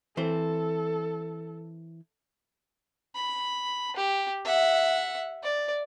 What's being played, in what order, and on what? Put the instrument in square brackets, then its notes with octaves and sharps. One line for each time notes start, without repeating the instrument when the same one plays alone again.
[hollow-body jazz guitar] E3 C4 C5 [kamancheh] A4
[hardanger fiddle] B5
G4
E5 F#5
D5